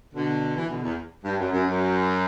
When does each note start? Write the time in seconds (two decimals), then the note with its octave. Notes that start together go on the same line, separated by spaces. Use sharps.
0.14 B2 D3
0.57 E3
0.70 B2 D3
0.83 E2
1.24 G2
1.39 F#2
1.52 F#2
1.67 F#2